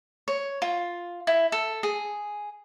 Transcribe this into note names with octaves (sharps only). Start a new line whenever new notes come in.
C#5
F4
E4
A4
G#4